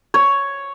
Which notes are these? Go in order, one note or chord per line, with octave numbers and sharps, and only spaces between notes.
C#5